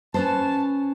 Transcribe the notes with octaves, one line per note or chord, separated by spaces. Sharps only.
C#4 B4 C5 A5